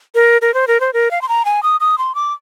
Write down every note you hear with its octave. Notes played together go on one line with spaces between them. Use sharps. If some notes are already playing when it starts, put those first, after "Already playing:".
A#4
A#4
C5
A#4
C5
A#4
F5
C6
A#5
G#5
D#6
D#6
C6
D6